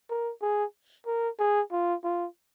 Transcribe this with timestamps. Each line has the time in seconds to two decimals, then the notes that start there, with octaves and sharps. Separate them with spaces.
0.10 A#4
0.42 G#4
1.06 A#4
1.39 G#4
1.72 F4
2.04 F4